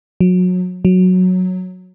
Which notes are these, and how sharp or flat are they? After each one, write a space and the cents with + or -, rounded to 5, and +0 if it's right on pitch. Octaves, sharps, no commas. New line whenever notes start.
F#3 -30
F#3 -10